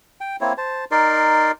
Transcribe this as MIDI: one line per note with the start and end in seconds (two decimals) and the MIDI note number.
0.21 0.36 79
0.41 0.53 58
0.41 0.53 60
0.41 0.53 64
0.41 0.53 73
0.58 0.85 72
0.58 0.85 81
0.91 1.51 63
0.91 1.51 70
0.91 1.51 74
0.91 1.51 84